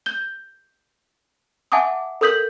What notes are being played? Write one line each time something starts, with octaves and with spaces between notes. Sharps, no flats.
G6 G7
E5 F#5 G#5 A5 D6 D#6
A4 A#4 D#6 G6 B6 F#7